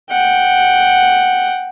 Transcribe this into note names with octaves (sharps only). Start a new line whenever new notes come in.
F#5 G5